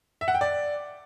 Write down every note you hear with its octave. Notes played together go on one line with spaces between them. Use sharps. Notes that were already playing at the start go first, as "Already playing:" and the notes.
E5
F#5
G5
D5